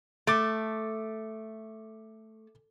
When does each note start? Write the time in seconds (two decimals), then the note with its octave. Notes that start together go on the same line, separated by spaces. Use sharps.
0.27 A3 D6 A6 D7